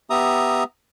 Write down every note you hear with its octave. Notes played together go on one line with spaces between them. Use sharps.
B3 G4 E5 A#5 D#6